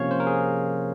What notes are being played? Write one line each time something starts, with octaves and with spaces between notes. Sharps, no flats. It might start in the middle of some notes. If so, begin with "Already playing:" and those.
Already playing: C3 F3 A#3 C#4 C#5 F5
C5
A#4
G#4